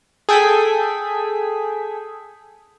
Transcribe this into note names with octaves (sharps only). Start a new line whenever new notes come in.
G#4 A4 G5 G#5 G#6 B6